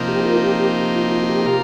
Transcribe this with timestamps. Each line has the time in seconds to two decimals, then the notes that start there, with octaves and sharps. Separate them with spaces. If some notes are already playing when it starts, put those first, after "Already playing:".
Already playing: C3 F3 A#3 D#4 C5
0.08 G4
0.25 F4 A#4
0.43 G4
0.60 G4
0.95 F4
1.12 F4
1.29 G4
1.46 F4 G4 A#4